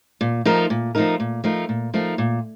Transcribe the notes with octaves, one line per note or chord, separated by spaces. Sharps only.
A#2
F3 A3 D#4 A#4
A#2
F3 A3 D#4 A#4
A#2
F3 A3 D#4 A#4
A#2
F3 A3 D#4 A#4
A#2